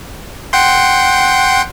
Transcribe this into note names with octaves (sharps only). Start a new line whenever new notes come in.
F#5 G5 C6